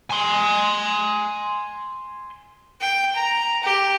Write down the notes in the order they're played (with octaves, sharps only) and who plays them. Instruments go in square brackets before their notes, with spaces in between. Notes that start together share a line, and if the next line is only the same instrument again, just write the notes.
[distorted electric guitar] G#5 C6
[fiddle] G5
A#5
G4